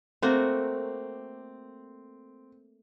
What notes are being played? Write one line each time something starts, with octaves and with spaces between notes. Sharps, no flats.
A3 A#3 C4 F#4